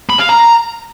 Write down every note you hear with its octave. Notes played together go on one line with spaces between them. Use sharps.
B5
F5
A#5